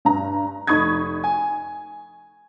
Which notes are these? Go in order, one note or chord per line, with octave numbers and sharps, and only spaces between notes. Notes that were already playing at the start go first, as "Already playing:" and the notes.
G2 A#5
F1 D#4 B5 C#6 D#6 G#6
G#5